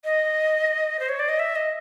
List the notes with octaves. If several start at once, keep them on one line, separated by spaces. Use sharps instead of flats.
D#5
C5
C#5
D5
D#5
E5
D#5